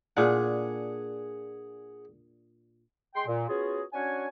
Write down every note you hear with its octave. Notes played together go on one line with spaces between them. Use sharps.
A#2 D4 G#4 F#5
G#3 G5 C6
A#2
B3 C#4 F4 F#4 G#4
C#4 D4 F#4 C#5 F#5 G#5